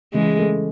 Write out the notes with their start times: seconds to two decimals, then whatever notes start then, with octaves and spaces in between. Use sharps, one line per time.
0.13 C#3 E3 G#3
0.39 A3